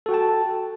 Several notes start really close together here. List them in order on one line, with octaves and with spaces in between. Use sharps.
A4 F#4 G5 A5